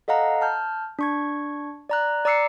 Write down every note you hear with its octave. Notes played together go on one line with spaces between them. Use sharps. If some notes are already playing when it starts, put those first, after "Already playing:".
A4 D#5 F5 F#5 A#5
A5 F6 G6
D4 C#6 G#6
D5 A#5 F#6
D5 A#5 D6 E6 C7 C#7